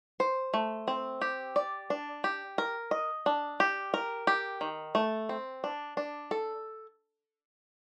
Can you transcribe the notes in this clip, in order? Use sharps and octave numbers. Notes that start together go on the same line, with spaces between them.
C5
A3
C4
G4
D5
D4
G4
A#4
D#5
D4
G4
A#4
G4
D#3
A3
C4
D4
D4
A4